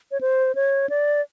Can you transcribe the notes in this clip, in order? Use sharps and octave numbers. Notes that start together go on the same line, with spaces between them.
C#5
C5
C#5
D5